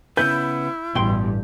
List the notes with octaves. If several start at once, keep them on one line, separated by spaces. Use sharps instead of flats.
C#3 B3 E4 B4 G6
A1 G2 B2 G5 C6